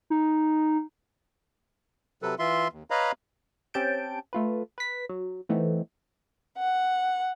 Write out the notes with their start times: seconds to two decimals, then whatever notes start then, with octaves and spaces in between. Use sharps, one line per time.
0.10 D#4
2.22 C3 F#3 A4 B4
2.39 E3 F4 E5 C6
2.73 D#2
2.90 B4 C#5 D#5 F5 A#5 B5
3.74 C4 C#4 G4 A5 G6 D7
4.33 A3 F4 B4
4.78 B4 B6
5.09 F#3
5.49 E3 A3 B3 C4 D#4
6.57 F#5